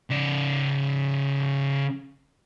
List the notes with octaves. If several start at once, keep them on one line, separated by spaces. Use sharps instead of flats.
C#3 D5